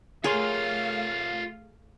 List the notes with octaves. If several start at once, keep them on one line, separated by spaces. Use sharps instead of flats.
A3 F4 G4 G#4 A#4 C#5 F5 C6